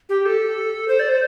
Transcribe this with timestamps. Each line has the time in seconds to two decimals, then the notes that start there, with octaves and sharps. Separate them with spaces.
0.09 G4
0.26 A4
0.88 C5
1.00 D5
1.09 C5